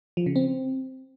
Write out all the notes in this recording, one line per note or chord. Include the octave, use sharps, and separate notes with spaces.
F3
C#3
C4